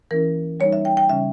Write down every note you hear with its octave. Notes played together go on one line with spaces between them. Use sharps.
E3 A#3 C#4 E4 A#4
G3 A#3 D#4 C#5
E5
G5
G5
C#3 G3 C#4 E5